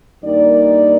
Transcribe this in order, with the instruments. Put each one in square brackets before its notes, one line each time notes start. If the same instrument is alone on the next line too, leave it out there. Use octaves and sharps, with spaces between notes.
[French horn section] G2 D#3 A#3 D#4 D5